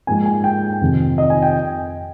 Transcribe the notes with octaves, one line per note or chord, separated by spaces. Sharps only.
G#2 F3 A#3 G#5
G#5
G5
F2 C3 D#3
D#5
G#5
G5